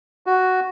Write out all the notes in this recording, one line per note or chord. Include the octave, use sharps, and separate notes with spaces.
F#4